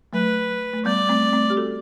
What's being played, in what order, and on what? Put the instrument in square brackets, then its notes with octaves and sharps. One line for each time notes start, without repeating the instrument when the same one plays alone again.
[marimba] F#3 A3 [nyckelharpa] B4
[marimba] A3
[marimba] G3 B3 [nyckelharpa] D5
[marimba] A3 C4
A3 C4
G4
F#4 A4